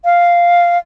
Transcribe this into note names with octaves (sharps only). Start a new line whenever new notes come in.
F5